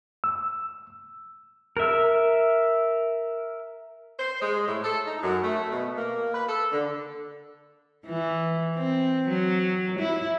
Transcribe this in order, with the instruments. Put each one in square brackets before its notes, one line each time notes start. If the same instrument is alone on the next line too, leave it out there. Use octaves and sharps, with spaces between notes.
[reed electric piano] E6
[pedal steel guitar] A#4 E5
[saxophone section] C5
G#3
A2
A4
D#4
F#2
A3
B2
A#3
B4
A4
D3
[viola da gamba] E3
C4
F#3
E4